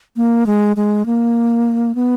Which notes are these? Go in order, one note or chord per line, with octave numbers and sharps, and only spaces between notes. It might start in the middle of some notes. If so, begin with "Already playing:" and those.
A#3
G#3
G#3
A#3
B3